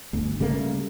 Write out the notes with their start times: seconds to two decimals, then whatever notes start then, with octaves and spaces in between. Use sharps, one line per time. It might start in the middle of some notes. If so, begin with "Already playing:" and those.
0.13 G1 D2
0.40 C#3 G3 A3 A#3